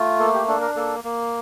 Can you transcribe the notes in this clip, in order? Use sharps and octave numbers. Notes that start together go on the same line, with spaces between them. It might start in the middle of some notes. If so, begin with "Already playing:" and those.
Already playing: A3 F4
A#3 A4
G4
D4 A4
A#4
A#3 A4
A#3